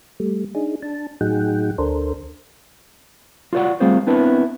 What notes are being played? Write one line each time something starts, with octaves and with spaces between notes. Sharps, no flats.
G3 A3
D4 D#4 G#4
D4 A5
A2 F#3 D#4 G#4 F#5 G5
D2 D4 A4 A#4 C5
F4 F#4 C5 D5 F#5
G3 A3 C4 F4 G#4 C5
B3 C4 D4 E4 B4